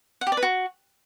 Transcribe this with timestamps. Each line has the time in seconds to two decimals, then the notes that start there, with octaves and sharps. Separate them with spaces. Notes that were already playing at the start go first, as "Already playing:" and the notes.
0.21 F#5
0.27 G4
0.32 D5
0.37 B4
0.43 F#4